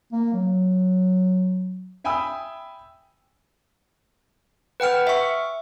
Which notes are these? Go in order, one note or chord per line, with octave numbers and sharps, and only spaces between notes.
A#3
F#3
E5 G5 G#5 B5 D#6 E6
B4 F#5 G5 F6
E5 C#6